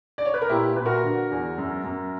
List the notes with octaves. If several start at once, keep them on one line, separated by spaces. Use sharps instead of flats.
D5
C#5
B4
A#4
A#2 E4 G4
A#2 B4
F#4 A#4
D3
E2
F#2
F#2